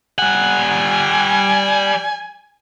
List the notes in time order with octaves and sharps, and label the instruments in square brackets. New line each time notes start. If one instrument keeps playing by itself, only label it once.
[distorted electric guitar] G3 F#5 [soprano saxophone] G#5